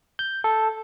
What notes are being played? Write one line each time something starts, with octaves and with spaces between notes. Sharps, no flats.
G6
A4